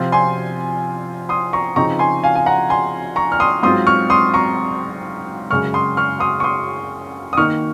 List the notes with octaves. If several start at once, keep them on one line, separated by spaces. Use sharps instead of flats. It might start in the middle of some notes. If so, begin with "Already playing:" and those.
Already playing: C3 F3 C4 F4
G#5 C6
C6 D#6
A#5 C#6
C#3 F3 C4 D#4 A#5 C#6
G#5 C6
F5 G#5
G#5
F#5 A#5
G#5 C6
A#5 C#6
F6
C6 D#6
G#2 F#3 C4 F4 C6 D#6
C#6 F6
C6 D#6
A#5 C#6
F#2 C#3 G#3 C#6 F6
C6 D#6
C#6 F6
C6 D#6
C#6
C6 D#6
D#6
D#3 A#3 D#4 C#6 F6